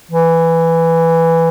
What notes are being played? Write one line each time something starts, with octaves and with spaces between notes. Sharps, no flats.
E3